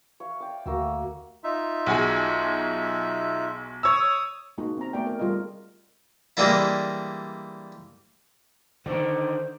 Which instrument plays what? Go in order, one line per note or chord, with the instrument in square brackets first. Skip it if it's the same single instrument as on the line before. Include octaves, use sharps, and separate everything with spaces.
[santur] C#5 F5
D5 G5 D6
[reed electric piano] D2 [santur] A#3 F#4 E6
[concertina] D#4 F4 E5
[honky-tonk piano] B1 F#4 G#4
[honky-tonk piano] C#5 E6 [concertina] D#6
[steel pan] G#3 A#3 D#4 F#4
C4 A#5
A3 B3 F#4 D5 G5
A#4
G3 F4 G#4 A#4 D#5
[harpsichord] E3 G3 G#3 A#3 D4 E4
[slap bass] D3 D#3 [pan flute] C5